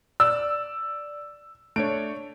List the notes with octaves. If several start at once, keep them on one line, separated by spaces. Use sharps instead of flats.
D5 E6
A3 D4 C#5 D7